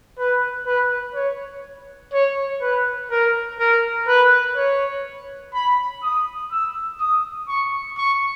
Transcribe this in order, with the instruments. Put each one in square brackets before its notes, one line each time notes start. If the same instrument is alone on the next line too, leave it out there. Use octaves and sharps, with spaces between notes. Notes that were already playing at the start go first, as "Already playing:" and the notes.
[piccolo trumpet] B4
B4
C#5
C#5
B4
A#4
A#4
B4
C#5
B5
D#6
E6
D#6
C#6
C#6